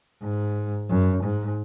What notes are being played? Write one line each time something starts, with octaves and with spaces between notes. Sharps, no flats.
G#2
F#2
G#2